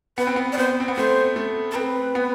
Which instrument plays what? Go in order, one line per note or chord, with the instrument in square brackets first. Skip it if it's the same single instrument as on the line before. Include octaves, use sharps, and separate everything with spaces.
[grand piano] B3 [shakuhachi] B4
[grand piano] C4
B3
[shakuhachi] D5
[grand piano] B3 [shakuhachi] C5
[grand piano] C4
B3
[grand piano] A3 [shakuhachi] C5
[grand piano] A3
[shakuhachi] A4
[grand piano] C4 [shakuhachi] B4
[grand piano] B3